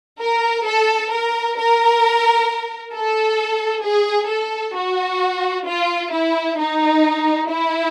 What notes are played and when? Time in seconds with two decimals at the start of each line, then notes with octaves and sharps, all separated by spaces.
0.21 A#4
0.67 A4
1.11 A#4
1.58 A#4
2.94 A4
3.85 G#4
4.30 A4
4.76 F#4
5.67 F4
6.13 E4
6.59 D#4
7.49 E4